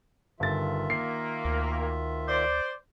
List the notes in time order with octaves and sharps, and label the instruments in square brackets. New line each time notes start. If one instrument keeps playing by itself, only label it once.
[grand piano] G1 A6 [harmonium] D#3 F4 E5
[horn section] A#3 [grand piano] C7
[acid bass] D2
[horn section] C5 D5